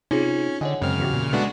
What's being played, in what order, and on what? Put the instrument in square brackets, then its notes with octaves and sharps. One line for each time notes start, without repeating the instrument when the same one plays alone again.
[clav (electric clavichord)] C3 [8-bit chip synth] C#4 [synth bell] D#4 F4 G#4
[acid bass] D3 [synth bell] C#5 F#5 G#5 [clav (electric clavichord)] D#5
[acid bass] F#2 [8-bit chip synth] C#3 F6 [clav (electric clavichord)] G#3 C4
[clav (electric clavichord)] E2 F#4 G4
[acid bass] A#2
[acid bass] G#3 [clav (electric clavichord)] A3 [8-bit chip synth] B3 D4 F#4